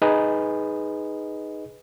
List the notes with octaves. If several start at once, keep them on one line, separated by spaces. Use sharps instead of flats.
D#4 G#4 B4 D#5